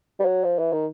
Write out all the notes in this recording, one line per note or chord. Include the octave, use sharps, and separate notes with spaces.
G3
F#3
F3
E3
D#3